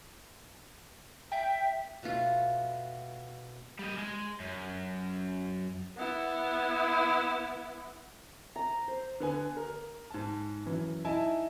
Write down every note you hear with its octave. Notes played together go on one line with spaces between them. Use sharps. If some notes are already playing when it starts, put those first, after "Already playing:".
E5 G5
B2 A3 F4
G3 D#5
G#3
F#2
B3 E4
A#5
C5
D3 B3 G#5
A#4
G#2 A5
F#2 E3
D#4 E4 G#5 A5